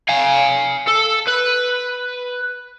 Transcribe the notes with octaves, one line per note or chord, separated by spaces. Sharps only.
F5 G#5
A4
B4